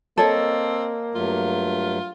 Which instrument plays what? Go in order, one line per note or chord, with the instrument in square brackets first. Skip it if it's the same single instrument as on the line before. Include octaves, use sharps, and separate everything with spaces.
[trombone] A#3 [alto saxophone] C4 [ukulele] A4 C#5 D#5
[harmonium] G2 F#3 A3 [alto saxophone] F4